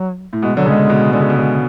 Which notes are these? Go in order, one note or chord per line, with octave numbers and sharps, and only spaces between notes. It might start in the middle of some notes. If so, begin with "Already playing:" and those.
Already playing: F#3
A2
B2 G#3
D3 F#3
C#3
G#3
B2
D3 G#3
C#3
B2
C#3 G#3